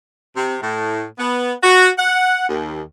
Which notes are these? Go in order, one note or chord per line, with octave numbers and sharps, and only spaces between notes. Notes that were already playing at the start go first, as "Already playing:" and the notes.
C3
A2
B3
F#4
F#5
D#2